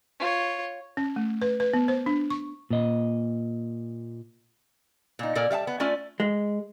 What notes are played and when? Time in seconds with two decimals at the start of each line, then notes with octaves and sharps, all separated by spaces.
0.19 F4 C#5
0.97 C#4
1.16 A3
1.42 B4
1.60 B4
1.74 B3
1.88 C5
2.06 D4
2.30 C#6
2.70 A#2 D#5
5.19 A#2 D#4
5.35 A#2 A4 A#4 D5
5.51 G3 E5 F5 A5
5.67 B3
5.80 A3 C#4 F4 D5 G#5
6.20 G#3